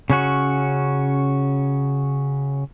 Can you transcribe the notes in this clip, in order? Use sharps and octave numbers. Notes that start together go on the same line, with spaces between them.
C#3 C#4 F#4